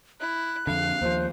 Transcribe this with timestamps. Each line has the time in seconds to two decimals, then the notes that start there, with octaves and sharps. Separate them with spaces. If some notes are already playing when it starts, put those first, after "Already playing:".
0.20 E4 F#6
0.67 F2 D3 F5
1.02 D#2 F3 C5